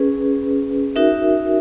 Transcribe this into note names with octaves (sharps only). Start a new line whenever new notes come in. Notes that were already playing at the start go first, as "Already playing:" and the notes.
Already playing: C#4 G#4 B4
D#4 F#4 A#4 E5